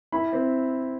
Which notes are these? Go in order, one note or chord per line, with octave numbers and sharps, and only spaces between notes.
E4 B5
C4